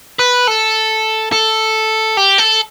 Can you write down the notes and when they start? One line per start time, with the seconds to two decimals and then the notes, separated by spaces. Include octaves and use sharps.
0.19 B4
0.47 A4
1.32 A4
2.17 G4
2.38 A4